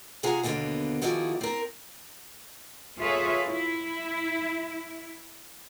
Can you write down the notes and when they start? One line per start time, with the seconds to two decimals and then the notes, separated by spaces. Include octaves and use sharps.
0.23 C3 F4 G#4 F#5 G#5 A#5
0.43 D#2 B2 D3 A#3 B3
1.02 D#3 F3 E4 F#4 G#4 D5
1.41 C4 A#4
2.99 F4 G#4 A4 B4 C#5 E5
3.47 E4